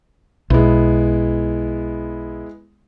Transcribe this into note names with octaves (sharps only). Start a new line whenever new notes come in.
B1 G#3 B3 E4